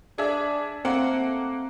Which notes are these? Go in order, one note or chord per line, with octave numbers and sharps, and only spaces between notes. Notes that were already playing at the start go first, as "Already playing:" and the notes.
D4 G#4 E5
A3 A#3 C4 F#5